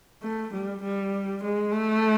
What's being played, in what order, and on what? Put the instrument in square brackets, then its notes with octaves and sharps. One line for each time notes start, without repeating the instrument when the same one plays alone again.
[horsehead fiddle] A3
G3
G3
G#3
A3